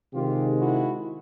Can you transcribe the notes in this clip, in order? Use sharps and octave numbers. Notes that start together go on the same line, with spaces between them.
C3 D#3 G#3 F4 G4
E4 F#4